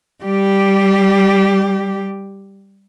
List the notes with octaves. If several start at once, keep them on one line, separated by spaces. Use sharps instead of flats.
G3 G4